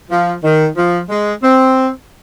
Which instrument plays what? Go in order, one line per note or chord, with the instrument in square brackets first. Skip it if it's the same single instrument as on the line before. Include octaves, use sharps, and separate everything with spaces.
[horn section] F3
D#3
F3
G#3
C4